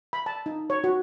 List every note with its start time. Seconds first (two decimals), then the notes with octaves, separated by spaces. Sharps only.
0.13 B5
0.26 A5
0.46 D#4
0.70 C#5
0.84 F#4